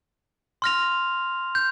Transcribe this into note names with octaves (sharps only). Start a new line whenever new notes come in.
C6 F6 A#6 F7
G6